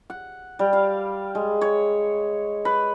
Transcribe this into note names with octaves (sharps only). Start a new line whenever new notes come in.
F#5
G3
F5
G#3
C#5
B4